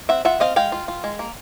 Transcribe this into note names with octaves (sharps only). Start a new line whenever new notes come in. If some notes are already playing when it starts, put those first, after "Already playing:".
C4 E5 F#5
F4 E5 F#5
C4 D#5 F5
G#3 F5 G5
F4
F4
G#3
A#3